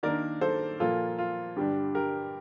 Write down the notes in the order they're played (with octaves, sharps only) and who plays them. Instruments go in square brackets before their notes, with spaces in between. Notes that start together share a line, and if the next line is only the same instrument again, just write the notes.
[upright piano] D#3 A#3 D4 A#4 D5
A4 C5
A#2 F3 A#3 F4 A4
F4
G2 D3 G3 D4 G4
G4 A#4